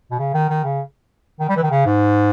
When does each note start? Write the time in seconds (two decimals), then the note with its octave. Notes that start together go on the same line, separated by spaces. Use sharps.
0.11 B2
0.19 C#3
0.34 D#3
0.50 D#3
0.64 C#3
1.40 D#3
1.49 G3
1.56 E3
1.63 D#3
1.71 C#3
1.86 G#2